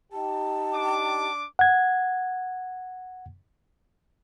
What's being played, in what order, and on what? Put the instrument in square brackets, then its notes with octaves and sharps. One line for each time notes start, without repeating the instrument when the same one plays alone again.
[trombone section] D#4 G4 [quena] A5
[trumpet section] D4 D6
[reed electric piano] F#5 G#6